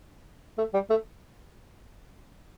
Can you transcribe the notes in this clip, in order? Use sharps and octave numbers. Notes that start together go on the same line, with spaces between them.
A3
G3
A3